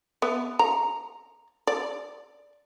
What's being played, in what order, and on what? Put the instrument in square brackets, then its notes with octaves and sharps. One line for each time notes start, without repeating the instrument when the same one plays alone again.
[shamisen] B3 E5
A#5
D5